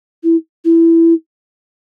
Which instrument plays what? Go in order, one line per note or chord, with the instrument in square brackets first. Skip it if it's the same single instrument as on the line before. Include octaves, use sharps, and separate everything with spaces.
[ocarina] E4
E4